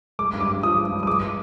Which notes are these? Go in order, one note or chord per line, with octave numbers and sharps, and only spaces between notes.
G#3 D6
G2
D6
G2
F3 D#6
G#3
G2
D#6
G#3 D6